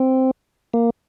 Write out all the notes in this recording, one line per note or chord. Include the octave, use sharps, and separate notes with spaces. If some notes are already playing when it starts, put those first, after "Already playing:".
Already playing: C4
A#3